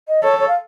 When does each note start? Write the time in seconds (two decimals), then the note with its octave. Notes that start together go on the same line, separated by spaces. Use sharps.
0.08 D#5
0.23 A4 C#5
0.39 C#5
0.48 F5